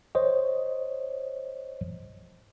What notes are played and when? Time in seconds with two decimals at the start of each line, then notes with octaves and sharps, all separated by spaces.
0.15 C5 C#5 D#5